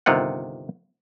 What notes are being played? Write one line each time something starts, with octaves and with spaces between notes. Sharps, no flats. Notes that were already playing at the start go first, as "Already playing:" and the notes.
G1 C3 D#3 F4 F#5